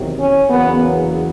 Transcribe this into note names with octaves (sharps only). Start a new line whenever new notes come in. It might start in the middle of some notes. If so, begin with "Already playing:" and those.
Already playing: E2 C3 D#3 F#3
C#4
E2 C#3 F#3 A#3 B3